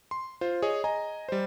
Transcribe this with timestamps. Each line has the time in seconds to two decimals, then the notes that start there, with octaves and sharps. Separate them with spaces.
0.11 C6
0.41 F4 C5
0.62 G#4 C#5 D#5
0.84 D#5 G#5 A#5
1.29 G3 C5